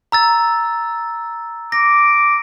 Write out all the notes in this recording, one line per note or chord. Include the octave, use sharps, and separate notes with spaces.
A#5 E6 A6
D6 A#6